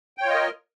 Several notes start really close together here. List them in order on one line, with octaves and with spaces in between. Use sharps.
G5 C#5 F4 D#5 A#4